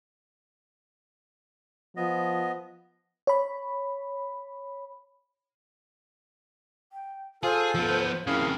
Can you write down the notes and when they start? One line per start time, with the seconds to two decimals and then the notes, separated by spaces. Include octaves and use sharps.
1.97 F3 B3 D#5
3.27 C#5 B5
6.92 G5
7.43 F4 G#4 A4 C5
7.75 F3 B3
8.27 F2 C#3 E4 G#4 A#4 F5